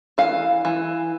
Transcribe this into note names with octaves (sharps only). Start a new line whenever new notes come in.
E3 F5
E3